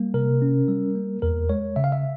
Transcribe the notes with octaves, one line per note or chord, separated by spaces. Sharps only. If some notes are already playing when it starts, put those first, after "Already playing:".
Already playing: G3 A#3
C3 A#4
C#4
G3
A#3
E2 A#4
G#3 C#5
C#3 E5
F5
E5